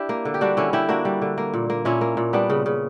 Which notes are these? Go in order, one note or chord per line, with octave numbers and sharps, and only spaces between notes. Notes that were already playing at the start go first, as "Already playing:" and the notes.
Already playing: D4 E4 G4
A#3
D3
G4
G3 D4 F#4
D3 C#4 E4
D3 E4 G4
A#3 D4 F#4
G3
D3
A#3
A#2
A#3
A#2 C#4 E4
A#3
A#2
G3 B3 D4
C#3
C#3